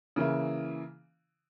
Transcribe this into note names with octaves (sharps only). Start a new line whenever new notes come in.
C#3 E3 A#3 E4